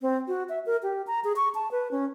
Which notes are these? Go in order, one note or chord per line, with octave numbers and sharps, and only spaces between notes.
C4
F#4
E5
A#4
G4
A#5
G#4
C#6
A5
B4
C#4